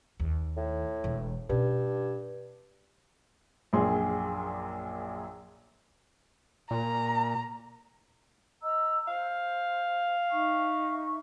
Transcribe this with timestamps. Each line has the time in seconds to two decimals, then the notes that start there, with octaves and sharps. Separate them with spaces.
0.20 D#2
0.57 A2
1.04 E1 E3
1.49 G2 B2 C#4
3.73 A#1 F#2 A#2 D4 G#4 C6
6.71 A#2 A#5
8.62 D#5 A#5 E6
9.08 C5 F5
10.31 D#4 E5 C#6